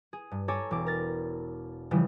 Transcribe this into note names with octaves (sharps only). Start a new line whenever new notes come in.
G#4
G2
A4 C#5 G#5 A#5 D6
E1 D6
A#4 A6
C#3 E3 F3 G3